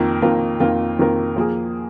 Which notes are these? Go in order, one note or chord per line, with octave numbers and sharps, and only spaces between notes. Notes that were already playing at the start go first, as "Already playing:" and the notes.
Already playing: F2 D#3 A#3 F4 A#4
F2 D#3 A#3 F4 A#4
F2 D#3 A#3 F4 A#4
F2 D#3 A#3 F4 A#4
F3 A#3 G#4